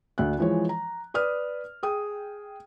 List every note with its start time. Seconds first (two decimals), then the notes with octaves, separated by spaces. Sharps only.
0.18 D2 D4 F#6
0.39 E3 F3 G#3 C#5
0.69 A#5
1.14 B4 D5 D#6 F6
1.83 G#4 G5 D#6